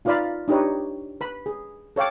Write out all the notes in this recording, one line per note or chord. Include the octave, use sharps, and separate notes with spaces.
D#4 F4 B4 D5 F5 B5
D4 D#4 G4 B4 C#5
B4 B5
G#4
A4 C#5 F5 G5 D6